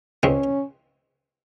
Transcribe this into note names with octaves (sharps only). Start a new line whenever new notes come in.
C#2 C#3 G#3 C4 C#4